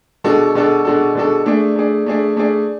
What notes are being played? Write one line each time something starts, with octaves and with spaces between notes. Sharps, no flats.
B2 G#3 D4 F#4 A4
B2 G#3 D4 F#4 A4
B2 G#3 D4 F#4 A4
B2 G#3 D4 F#4 A4
A3 D4 G#4 D5
A3 D4 G#4 D5
A3 D4 G#4 D5
A3 D4 G#4 D5